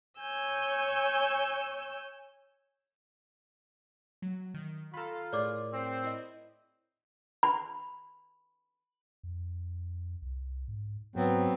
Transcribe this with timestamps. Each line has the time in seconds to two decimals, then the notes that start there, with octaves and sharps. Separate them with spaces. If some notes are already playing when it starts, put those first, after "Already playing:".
0.20 C#5 G#5 E6 G6
4.22 F#3
4.54 D#3
4.94 D#3 F4 A4 A#5 B5
5.32 A2 G#4 A#4 C#5 D5 D6
5.73 C4
6.04 E4 D#5
7.43 B5
9.23 F2
10.22 C2
10.68 G#2
11.16 G#2 F#3 B3 C4